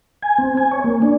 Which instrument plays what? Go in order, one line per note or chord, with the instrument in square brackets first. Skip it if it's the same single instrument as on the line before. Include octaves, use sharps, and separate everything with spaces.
[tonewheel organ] G#5
C4
G#5
C#5
A#3
D4